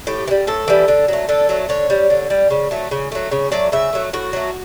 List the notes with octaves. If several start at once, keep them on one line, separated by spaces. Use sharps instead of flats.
A2 G4
E3
G3
A2 A4
E3 G3
D3
F#3 A3
D3 A4
F#3 A3
D3 C#5
G3
D3
G3
C#3
F#3 A3
C#3
F#3 A3
C#3 C#5
F#3 A3 D5
C#3 E5
F#3 A3
A2 F#4
F#3 A3